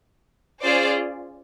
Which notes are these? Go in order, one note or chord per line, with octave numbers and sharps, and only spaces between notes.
C#4 F4 G#4 C5 D5